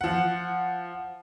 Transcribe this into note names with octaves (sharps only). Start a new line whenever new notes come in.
F3 F#5